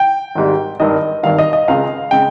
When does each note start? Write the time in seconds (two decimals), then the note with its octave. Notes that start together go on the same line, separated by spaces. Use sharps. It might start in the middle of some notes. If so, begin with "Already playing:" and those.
Already playing: G5
0.35 G#1 G#2 G3
0.80 G#1 G2 D#3 D#5
1.23 G#1 G2 D#3 F5
1.39 D#5
1.53 D#5
1.68 C#2 C#3 G#3 F5
2.11 C#3 G#3 G5